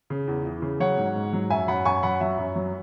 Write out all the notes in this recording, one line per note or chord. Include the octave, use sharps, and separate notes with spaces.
C#3
E2
E3
C#3
F#3 C#5 F#5
G#2
G#2
F#3
F#2 E5 G#5
F#2 F#5 B5
F#2 G#5 C#6
F#2 F#5 B5
F#3 E5
F#2
F#3